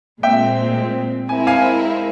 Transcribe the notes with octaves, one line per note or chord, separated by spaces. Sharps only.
A#2 G#3 C4 E5 G5
G#3 C4 E4 A#4 G#5
F5 G#5